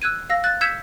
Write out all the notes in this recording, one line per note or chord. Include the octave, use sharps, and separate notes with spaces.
E6 F#6 G#6 D#7
F5 E6 A#6
F#6 A6
E6 G6 G#6 B6 C#7 E7